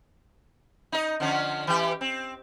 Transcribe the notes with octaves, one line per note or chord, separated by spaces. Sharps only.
D#4 D#5
D3 F3 C#4
E3 G4
C4